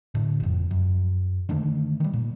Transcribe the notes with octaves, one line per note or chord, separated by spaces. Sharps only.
A2 D3
G1 F2
F#2
D3 D#3 A3
D#3 G3
A#2